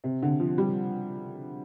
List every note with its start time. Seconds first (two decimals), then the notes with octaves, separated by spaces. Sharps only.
0.04 C3
0.22 D3
0.40 F3
0.58 G3